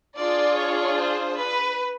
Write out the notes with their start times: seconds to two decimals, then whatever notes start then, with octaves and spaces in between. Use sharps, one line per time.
0.17 D4 F4 G#4 D5
0.57 C#5
0.98 C5
1.39 B4